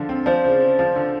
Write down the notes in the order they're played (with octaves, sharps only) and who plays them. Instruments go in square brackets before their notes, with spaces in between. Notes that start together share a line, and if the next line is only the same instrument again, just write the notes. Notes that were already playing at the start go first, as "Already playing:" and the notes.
Already playing: [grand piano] D3 F3 F4
C4
[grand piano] F3 [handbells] C5 D5
[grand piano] C#3
C#3
F3
D3